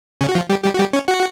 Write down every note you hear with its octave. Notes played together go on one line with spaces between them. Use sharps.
C#3 C#4
F#4
F3 F4
G3 G4
G3 G4
F#4
G3 G4
C#4 C#5
F#4 F#5